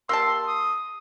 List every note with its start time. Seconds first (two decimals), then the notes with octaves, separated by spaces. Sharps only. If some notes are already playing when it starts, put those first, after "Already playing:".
0.09 A#3 G4 A5 C6 E6
0.47 D#6